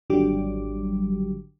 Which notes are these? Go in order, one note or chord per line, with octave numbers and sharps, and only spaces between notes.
G#1 D3 F#3 G3 G4 D6